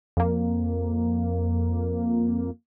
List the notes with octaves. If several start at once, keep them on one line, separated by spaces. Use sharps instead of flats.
F2 A#3